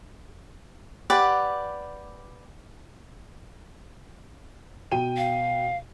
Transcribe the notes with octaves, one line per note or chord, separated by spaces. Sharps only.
G4 B4 D5 F#5
B2 G5 D#7
F5